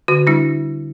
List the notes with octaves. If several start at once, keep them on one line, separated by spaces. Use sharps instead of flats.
D3 F#4
G3 D4 E4